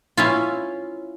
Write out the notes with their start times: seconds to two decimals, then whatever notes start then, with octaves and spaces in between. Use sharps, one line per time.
0.17 C#4 E4 F4